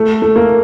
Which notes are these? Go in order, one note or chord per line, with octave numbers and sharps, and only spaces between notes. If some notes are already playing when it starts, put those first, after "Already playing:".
Already playing: A3
A3
A#3